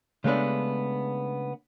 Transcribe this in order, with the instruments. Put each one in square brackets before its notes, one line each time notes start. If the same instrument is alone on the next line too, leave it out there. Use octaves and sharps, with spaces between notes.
[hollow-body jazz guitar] C#3 G#3 A3 B3 D4